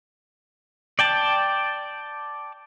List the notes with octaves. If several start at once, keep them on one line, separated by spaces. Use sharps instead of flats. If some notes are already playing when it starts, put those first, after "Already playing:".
D5 G5 A5